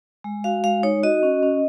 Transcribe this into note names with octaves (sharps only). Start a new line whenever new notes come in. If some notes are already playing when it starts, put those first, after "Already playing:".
G#3
F#4 F5
G#3 F5
D#4 C#5
F#4 D#5
C#4
C#4